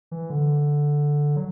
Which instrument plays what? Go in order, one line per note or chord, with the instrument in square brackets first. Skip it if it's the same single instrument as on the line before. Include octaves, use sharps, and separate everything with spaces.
[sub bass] E3
D3
F#3